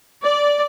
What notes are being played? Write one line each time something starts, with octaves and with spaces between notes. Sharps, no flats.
D5